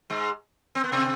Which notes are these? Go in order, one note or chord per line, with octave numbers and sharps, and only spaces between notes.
G#2 G#3
C4
B3
C3 C4